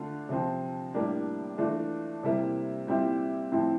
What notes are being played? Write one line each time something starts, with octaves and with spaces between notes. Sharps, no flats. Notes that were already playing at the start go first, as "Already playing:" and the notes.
Already playing: D3 A3 D4 F4
C3 F3 C4
A2 G3 A#3 D4
E3 A3 D4 F4
C3 G3 A#3 E4
A#2 G3 C4 E4
A2 F3 C4 E4